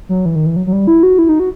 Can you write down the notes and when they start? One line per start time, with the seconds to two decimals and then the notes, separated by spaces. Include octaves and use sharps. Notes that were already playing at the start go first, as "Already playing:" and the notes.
0.09 F#3
0.26 E3
0.36 D#3
0.46 E3
0.56 F#3
0.67 F#3
0.72 G3
0.87 E4
1.03 F#4
1.19 E4
1.29 D#4
1.40 F#4